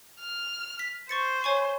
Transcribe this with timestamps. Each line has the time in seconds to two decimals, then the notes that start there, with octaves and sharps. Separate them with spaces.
0.20 F6
0.79 B6
1.09 C5 C#6 A6 C#7
1.44 C#5 G#5 C#6